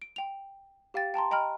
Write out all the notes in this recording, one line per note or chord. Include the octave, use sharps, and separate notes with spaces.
D7
G5 F7
G4 F5 G5 A6
G5 A5 A#5 C6
D#5 G5 A#5 B5 F6